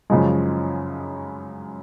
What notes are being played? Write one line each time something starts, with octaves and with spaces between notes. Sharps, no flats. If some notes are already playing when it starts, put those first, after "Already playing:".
F#2 C#3 F3 G#3